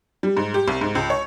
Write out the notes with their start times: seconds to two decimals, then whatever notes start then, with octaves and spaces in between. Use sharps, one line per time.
0.23 G3
0.37 G#2
0.54 G4
0.68 C2
0.81 G#2
0.95 C#2
1.10 C#5